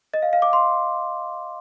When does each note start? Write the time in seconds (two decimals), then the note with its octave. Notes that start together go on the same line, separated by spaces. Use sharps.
0.14 D#5
0.22 F5
0.33 F5
0.42 D6
0.53 C6